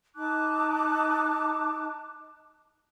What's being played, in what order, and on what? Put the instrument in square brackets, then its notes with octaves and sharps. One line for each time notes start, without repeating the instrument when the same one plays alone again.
[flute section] D#4 A5 D6 F#6